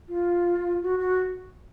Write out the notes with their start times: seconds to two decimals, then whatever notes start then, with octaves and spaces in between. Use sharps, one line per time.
0.09 F4
0.82 F#4
0.99 F#4